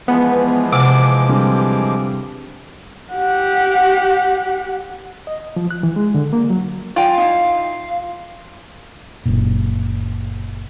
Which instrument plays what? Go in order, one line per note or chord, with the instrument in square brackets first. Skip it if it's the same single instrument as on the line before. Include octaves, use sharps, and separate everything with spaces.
[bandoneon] E3 F3 G#3 [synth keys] B3
[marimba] C3 [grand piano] F#5 F6 [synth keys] D6
[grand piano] D3 G3 C4
[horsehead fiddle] G4 F#5
[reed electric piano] D#5
F3
F#6
E3
G#3
D3
A#3
F#3
[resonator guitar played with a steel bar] F4 [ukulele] D5 G5 G#5
[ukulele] D#4 E4 [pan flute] F5
[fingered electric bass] F#1 A#2